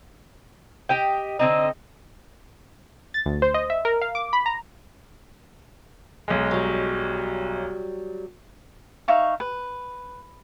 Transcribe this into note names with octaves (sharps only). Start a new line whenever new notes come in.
G4 D#5 G5
D3 C4 D#4 D#5
A6
D2
C5
D#5
E5
A#4
F5
D6
B5
A#5
B1 G#3
F#3 G3
D#4 E5 F5 C#6
B4